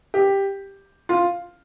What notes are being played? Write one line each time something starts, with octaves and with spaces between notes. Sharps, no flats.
G4
F4